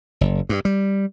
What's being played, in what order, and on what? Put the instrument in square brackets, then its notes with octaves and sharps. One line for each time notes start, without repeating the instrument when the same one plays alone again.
[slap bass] F#1
G2
G3